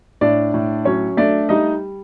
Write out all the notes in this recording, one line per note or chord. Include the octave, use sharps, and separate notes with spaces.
A2 D4 D5
A2
F#3 C#4 C#5
A3 D4 D5
G3 D#4 D#5